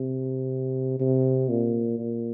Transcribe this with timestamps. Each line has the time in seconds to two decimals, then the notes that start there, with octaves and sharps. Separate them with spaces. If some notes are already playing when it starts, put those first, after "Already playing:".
Already playing: C3
1.00 C3
1.49 A#2
1.98 A#2